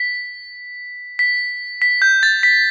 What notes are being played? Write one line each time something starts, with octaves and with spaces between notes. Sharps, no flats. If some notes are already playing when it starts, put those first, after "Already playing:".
Already playing: B6
B6
B6
G6
A6
B6